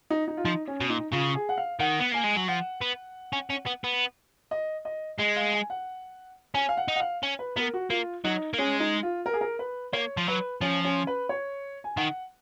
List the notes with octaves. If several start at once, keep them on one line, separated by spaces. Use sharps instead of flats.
D#4
D#4
F4
F3 D#4
C#4
B2
A#2 D#4
C#3 F4
G#4
F#5
F5
D#3 F#5
B3
A#3 G#5
G#3
F#3
F3 F#5
B3
C#4
C#4
B3
B3
D#5
D#5
G#3 D#5
F5
G#5
F#5
C#4 G#5
F5
F#5
D#4
F#5
F5
C#4
B4
B3 A#4
F#4
A#3 F4
F#3 D#4
A#3
G#3 C#4
D#4
F4
A#4
G#4
A#4
B4
A#3 C#5
F3
F#3 B4
F3 C#4
C#4
B4
C#5
G#5
D#3 F#5